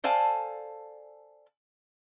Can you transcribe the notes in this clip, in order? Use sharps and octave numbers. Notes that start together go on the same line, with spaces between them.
A4 C5 D5 F5 G#5 A5